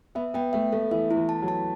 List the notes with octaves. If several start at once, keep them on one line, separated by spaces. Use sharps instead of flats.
B3 E5
B3 G5
A3 E5
A3 A4
E3 E5
E4
E3
A5
F#3
A5